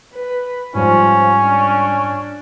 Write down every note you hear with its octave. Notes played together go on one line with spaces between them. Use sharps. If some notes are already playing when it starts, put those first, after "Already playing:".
B4
G#2 F3 G3 C#4
D4